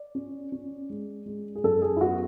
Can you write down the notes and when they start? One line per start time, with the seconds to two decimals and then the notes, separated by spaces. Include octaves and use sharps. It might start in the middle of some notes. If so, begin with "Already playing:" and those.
Already playing: D5
0.15 C#4
0.52 C#4
0.90 G#3
1.26 G#3
1.55 G#4
1.64 F#2 A4
1.82 G#4
1.96 E4
2.01 B3 F#4